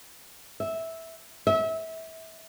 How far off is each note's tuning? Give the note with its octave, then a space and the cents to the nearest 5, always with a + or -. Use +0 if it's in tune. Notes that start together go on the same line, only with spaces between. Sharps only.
E5 -10
E5 -30